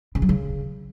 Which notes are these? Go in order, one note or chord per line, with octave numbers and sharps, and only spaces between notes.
C#3
F#3
C#3